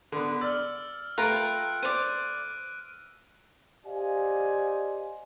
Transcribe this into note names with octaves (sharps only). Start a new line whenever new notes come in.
D3 B3
D5 E6 F6
A3 F4 B4 G5 A#5 F#6 D7
C5 D5 D#7
G4 C5 D5 D#5 F5 G#5